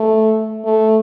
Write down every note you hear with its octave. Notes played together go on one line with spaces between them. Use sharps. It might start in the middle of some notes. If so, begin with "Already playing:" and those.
Already playing: A3
A3